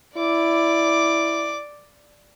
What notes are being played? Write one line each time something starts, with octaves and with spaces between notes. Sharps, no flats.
E4 D5 D6